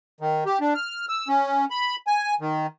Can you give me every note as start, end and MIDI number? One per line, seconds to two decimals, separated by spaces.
0.21 0.44 51
0.46 0.59 67
0.61 0.74 62
0.75 1.05 89
1.09 1.28 88
1.28 1.65 61
1.70 1.96 83
2.07 2.34 80
2.40 2.67 51